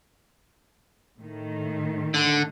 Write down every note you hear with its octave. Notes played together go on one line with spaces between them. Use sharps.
A2 D#3 A3
D3